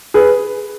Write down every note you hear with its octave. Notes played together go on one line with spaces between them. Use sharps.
G#4 B4